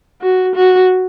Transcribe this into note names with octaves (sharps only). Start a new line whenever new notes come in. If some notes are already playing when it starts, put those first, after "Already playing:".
F#4
F#4